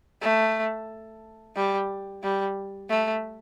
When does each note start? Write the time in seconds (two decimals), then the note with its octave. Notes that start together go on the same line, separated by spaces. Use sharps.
0.21 A3
1.56 G3
2.23 G3
2.90 A3